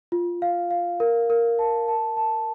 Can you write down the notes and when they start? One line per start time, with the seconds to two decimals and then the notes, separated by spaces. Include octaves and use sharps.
0.12 F4
0.42 F5
0.71 F5
1.00 A#4
1.30 A#4
1.59 A5
1.88 A5
2.17 A5